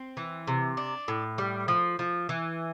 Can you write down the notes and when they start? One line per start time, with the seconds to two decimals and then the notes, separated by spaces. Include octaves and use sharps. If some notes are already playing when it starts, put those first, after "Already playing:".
Already playing: C4
0.17 E3
0.47 C3
0.77 D4
1.08 A2
1.38 G3
1.68 F3
1.99 F3
2.29 E3